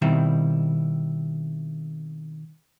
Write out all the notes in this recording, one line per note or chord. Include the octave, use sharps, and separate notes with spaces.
B2 D#3 G3 C4 E4